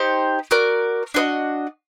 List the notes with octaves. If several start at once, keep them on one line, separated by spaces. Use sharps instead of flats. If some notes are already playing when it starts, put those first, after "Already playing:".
Already playing: D#4 G4 C5
F#4 A#4 D5
D4 F#4 B4 D#5